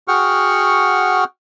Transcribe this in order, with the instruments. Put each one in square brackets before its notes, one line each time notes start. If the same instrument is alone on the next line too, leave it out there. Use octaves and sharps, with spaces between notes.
[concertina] F#4 G#4 F#5 G5 C#6 F6